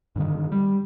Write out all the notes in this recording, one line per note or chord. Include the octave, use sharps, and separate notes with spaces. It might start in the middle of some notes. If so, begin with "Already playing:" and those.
G2 D3 D#3
G3